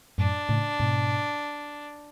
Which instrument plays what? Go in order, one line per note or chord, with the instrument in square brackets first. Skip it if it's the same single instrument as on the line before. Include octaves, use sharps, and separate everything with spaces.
[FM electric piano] F#2 A2 [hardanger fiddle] D4
[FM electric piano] A2 C#3
G#2 B2